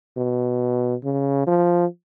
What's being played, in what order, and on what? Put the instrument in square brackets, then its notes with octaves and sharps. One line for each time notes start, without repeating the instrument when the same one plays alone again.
[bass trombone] B2
C#3
F3